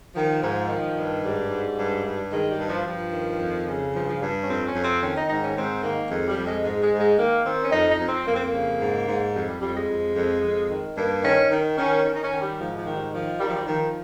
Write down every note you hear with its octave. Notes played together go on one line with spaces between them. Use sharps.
D#3 F3
G#2
D#3
G2
G#2 G3
G#2
G2
G2
D#3 G#3
G3
G2
F3
G2 F3
D#3
F2
C#3
G2 F3
F3
G2 G3
C#4
F2 C4
C#4
F2
C4
D#3 C#4
D#4
G#2 D#4
C#4
G#2 C4
D#3 A#3
F2 G#3
G3
F2
G#3
G#2 G#3
G#3
G#2
G#3
D#3 A#3
D#3 C4
C#4
F2 D#4
D#4
F2
C4
F2 A#3
C4
A#3
C#3
G#2
G#2
F2 G3
G3
F2 G3
G#3
F2
F2
F2
D#3
G2 A#3
D#3 C#4
D#3
D#3 C#4
D#3 C#4
D#4
C#4
D#3
G3
G#2 F3
F3
D#3
G3
D#3 F3
D#3 G3
F3
G3
D#3 F3